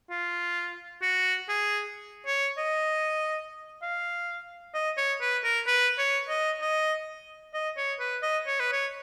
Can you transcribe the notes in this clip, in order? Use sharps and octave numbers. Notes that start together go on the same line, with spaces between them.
F4
F#4
G#4
C#5
D#5
F5
D#5
C#5
B4
A#4
B4
C#5
D#5
D#5
D#5
C#5
B4
D#5
C#5
B4
C#5